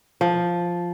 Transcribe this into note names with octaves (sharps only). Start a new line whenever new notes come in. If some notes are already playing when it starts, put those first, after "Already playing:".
F3